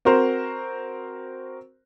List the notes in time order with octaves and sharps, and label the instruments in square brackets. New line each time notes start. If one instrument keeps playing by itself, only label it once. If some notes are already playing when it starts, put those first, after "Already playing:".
[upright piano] C4 F#4 A#4 C5